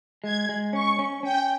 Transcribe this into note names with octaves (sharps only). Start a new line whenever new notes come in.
G#3 G#6
G#3
C#4 C#6
C#4
C#4 G5